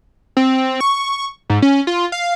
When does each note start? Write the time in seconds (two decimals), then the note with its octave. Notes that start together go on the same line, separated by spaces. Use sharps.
0.37 C4
0.80 C#6
1.50 G#2
1.62 C#4
1.87 F4
2.12 F5